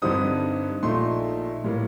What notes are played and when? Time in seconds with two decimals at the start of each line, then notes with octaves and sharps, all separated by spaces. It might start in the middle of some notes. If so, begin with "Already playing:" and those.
0.02 G2 D3 G3 C4 D#4 D#6
0.83 A#1 A#2 A3 D#4 C6
1.64 A2 G3 A#3